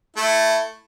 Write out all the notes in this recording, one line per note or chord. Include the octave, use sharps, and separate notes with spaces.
A3 E4